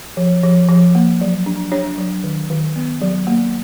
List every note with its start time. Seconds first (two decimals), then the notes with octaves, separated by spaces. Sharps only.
0.17 F3
0.43 F3
0.69 F3
0.95 A#3
1.21 F#3
1.46 D4
1.72 D4 C#5
1.98 F#3
2.24 D#3
2.50 D#3
2.76 B3
3.01 F#3
3.27 A#3